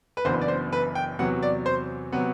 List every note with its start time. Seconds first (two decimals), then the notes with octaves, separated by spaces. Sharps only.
0.17 B4
0.25 F#1 F#2 E3 B3 D4 C5
0.41 D5
0.48 C5
0.72 B4
0.95 G5
1.19 E2 C3 F#3 B3 F#5
1.43 D5
1.66 C5
2.12 C3 F#3 B3